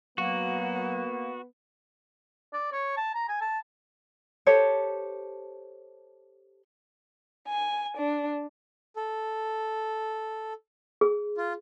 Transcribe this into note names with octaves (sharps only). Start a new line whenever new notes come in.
F#3 A#3 B3 F#4
D5
C#5
A5
A#5
G#5
A5
G4 A4 C5 C#5
G#5
D4
A4
G#4
F4